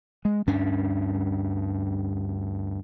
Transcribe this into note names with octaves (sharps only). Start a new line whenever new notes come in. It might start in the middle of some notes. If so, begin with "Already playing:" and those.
G#3
D2 G2 C#4 D4